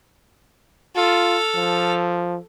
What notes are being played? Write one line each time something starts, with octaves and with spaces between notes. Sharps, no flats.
F4 A4 F6
F3